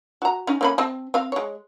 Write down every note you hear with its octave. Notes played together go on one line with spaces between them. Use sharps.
F#4 A#5
C#4 D#4
A#3 C#4 B5
C4 A5
C4 F5
G#3 C#5